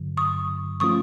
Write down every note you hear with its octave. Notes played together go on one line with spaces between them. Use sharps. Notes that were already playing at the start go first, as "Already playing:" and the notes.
Already playing: G2 D3 F#3
C#6 D#6
F3 A3 C#4 F4 C#6 D#6